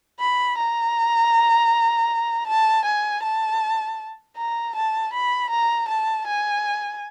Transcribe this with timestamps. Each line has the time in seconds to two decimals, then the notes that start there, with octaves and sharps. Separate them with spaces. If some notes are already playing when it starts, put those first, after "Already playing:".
0.19 B5
0.58 A#5
2.48 A5
2.85 G#5
3.23 A5
4.37 A#5
4.75 A5
5.13 B5
5.50 A#5
5.89 A5
6.27 G#5